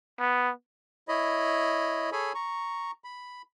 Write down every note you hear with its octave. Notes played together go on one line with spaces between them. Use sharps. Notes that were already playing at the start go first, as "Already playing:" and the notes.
B3
E4 C#5 D#5 B5
G#4 A4 C#5 G#5 B5
A#5 C#6
B5